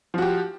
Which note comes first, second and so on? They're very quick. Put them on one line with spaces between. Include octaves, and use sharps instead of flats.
F3 F#4 G4